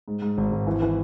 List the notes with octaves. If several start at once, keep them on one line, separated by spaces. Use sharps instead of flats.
G#2
G#2
G#1
G#1
E3
E3